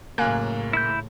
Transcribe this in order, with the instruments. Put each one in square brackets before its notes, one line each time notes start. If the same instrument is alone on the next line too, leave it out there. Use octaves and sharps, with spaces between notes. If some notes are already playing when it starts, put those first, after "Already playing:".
[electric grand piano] F#2 A#3 [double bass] A2 C#3 [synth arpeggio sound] F5 G#5 F#6
[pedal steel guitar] E4 B5 G6